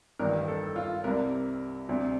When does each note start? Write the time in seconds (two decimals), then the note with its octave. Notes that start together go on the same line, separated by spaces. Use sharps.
0.19 A1 G2 D#3 G3 A#4
0.48 A4
0.76 F4
1.04 C2 C3 G3 A#4
1.89 D2 C3 G3